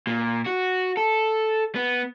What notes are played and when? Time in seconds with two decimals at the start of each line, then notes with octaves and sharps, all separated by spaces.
0.07 A#2
0.46 F#4
0.97 A4
1.75 B3